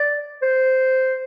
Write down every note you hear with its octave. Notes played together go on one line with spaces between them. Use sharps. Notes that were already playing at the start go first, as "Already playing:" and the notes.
Already playing: D5
C5